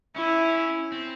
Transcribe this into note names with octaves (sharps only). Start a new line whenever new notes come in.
C#4 E4
C4